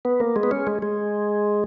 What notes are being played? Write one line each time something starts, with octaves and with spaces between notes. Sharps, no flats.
B3
A#3
G#3
B3
C#4
G#3
G#3